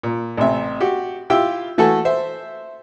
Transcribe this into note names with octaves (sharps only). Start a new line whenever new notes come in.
A#2
A1 C3 E5
F#4 G4
E4 F4 G4 G5 E6
E3 A3 F#4 A4 G#5 A5
C5 E5